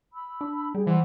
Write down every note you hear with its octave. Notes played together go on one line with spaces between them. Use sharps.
B5 E6
D4
G3 G#4 G5
E3 C5 F#5 B5